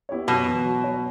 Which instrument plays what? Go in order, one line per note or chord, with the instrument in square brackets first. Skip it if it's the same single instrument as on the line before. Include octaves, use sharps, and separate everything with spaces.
[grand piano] B3 E4 G4 C#5
[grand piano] F#2 [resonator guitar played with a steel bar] B2
[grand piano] E3 B3
F#3
B3 F#4 C#5